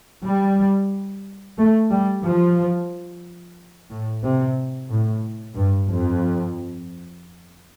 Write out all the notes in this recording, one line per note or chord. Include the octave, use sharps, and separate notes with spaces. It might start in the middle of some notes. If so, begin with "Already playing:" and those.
G3
A3
G3
F3
A2
C3
A2
G2
F2